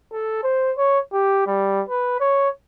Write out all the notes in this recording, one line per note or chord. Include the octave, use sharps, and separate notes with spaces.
A4
C5
C#5
G4
G3
B4
C#5